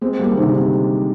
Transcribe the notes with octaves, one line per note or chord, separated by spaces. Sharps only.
G#3 C4
G3 A#3
D3
C3 D#3
D3
C3